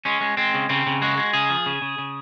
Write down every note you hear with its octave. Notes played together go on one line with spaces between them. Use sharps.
G#3 C#4
G#3
G#3 C4
C#3
C#3 C4
C#3
G#3 F#4
G#3
C#3 G#4
F3
C#3
C#3
C#3